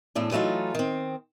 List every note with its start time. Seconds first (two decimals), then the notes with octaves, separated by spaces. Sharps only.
0.15 E2 A2 A3 D4
0.31 E3 F#3 A3 D#4 F4
0.75 D#3 C4